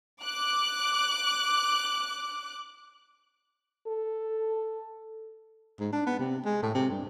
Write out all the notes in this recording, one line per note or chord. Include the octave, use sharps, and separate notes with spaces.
D6 F#6
A4
G#2
D4
B3
C3
G#3
A2
C3
G2